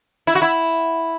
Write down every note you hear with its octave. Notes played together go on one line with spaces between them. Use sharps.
E4
F#4
E4